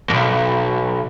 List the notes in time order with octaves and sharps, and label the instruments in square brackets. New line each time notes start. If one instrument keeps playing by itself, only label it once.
[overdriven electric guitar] B1 F2